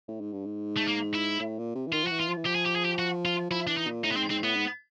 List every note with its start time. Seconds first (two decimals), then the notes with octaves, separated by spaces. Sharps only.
0.08 A2
0.21 G#2
0.32 G2
0.45 G#2
0.76 A3
0.87 A#3
1.14 E4
1.40 A2
1.58 A#2
1.75 C3
1.87 E3
1.93 D#3 F4
2.04 F3
2.07 E3 F#4
2.20 F4
2.28 F3
2.37 E3
2.46 F3 G4
2.55 G#4
2.66 G4
2.76 G#4
2.85 G4
2.99 F#4
3.25 F4
3.51 F3 E4
3.67 E3 D4
3.77 D#4
3.87 A#2
4.04 A2 D#4
4.12 B3
4.16 G#2 C4
4.30 G#2 C4
4.43 A2 B3
4.56 G#2